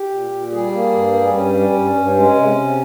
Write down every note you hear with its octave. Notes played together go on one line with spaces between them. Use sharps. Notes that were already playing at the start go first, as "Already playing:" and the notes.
Already playing: G4
A#2
A#2
G3 G#4
A#3
G2
G3
G2 C#4
G3
G2
G2
G#3 C#4
C3
C3